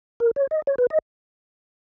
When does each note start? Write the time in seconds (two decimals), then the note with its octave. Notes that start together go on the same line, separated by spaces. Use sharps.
0.20 A#4
0.36 C#5
0.51 D#5
0.67 C#5
0.78 B4
0.90 D#5